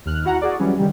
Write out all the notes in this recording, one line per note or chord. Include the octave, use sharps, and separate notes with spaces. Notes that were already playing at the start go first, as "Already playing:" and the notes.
D#2 F6 F#6
E4 F#4 F#5 A#5
F#4 G#4 D5
E3 F#3 G3 C#4
D3 D#3 G3